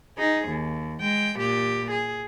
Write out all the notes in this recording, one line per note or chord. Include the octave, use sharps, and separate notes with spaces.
D#4 G#4
D#2
G#3 G5
A#2 G4
G#4